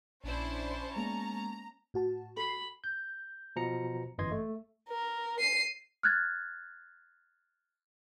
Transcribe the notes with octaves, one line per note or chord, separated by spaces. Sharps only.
A#1 C#4 D4 E4 C5 A5
G#3 A#3 B3 A#5
A2 F#4 A5
A4 B5 C7
G6
B2 F3 A#5 C#7
G1 F#2 E3 D#5 C6 G#6
A3
A#4
C7 D#7
F6 F#6 G#6 A6